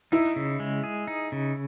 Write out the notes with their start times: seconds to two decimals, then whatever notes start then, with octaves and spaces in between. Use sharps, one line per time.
0.12 D#4 E4
0.36 C#3
0.60 G#3
0.84 G#4
1.07 D#4
1.32 C#3